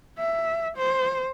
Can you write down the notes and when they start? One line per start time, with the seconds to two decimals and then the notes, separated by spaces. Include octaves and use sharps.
0.19 E5
0.77 C5